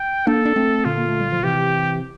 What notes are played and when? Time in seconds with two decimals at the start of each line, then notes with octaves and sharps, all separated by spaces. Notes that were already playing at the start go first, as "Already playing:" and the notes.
Already playing: G5
0.27 A#3 D4 A4
0.45 D4
0.56 A3 C4
0.85 A#2 D3 F4
0.97 A#3
1.09 A3
1.20 G3
1.32 F3
1.43 C3 E3 G4